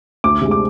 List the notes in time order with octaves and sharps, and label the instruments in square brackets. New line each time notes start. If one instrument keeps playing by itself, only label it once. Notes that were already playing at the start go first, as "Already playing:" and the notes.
[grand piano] D2 D6
C3 G#3
D6